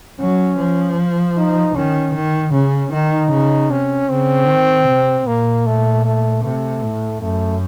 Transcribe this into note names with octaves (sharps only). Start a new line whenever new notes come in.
F#3 C#4
F3
D#4
D#3 C#4
D#3
C#3 C#4
D#3 D#4
C#3
C3 C#4
C#3 C4
D#3
C3
A#2 A#3
A3
A3
C3 A3
A2
F#2 A3